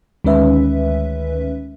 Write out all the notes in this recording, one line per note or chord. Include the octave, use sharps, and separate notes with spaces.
D2 D#3 G#3 C#4 B4 E5